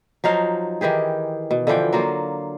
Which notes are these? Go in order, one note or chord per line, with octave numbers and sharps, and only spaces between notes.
F3 F#3 D#4 F5
D#3 E3 G4 G#4
B2
D3 E3 F3 G5
F#3 A#3 F4